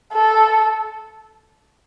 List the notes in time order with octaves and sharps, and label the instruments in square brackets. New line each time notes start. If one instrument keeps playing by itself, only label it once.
[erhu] A4